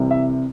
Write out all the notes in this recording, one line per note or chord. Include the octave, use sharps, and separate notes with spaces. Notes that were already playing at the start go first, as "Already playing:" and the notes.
Already playing: C2 C3 E3 G3
E5